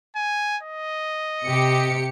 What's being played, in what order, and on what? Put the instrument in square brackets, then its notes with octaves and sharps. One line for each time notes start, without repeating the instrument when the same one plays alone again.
[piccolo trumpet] G#5
D#5
[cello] C3 [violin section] G4 C#7